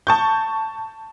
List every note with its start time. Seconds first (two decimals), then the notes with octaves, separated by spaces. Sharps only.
0.07 A5 C#6 G6